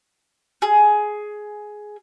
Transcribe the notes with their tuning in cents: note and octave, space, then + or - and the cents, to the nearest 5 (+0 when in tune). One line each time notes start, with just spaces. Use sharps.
G#4 +10